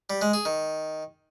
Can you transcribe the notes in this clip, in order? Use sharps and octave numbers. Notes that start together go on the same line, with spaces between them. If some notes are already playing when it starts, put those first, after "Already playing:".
G3
G#3
G#4
D#3